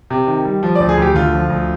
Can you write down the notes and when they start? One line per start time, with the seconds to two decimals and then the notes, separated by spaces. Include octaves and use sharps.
0.10 C3
0.27 D#3
0.45 G3
0.63 F3
0.75 D5
0.80 D2
0.89 G#4
0.98 D2 G4
1.15 D3 F4
1.33 F3
1.50 D2